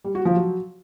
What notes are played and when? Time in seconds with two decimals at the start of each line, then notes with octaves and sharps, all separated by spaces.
0.04 G3
0.15 F#4
0.25 F3
0.36 F#3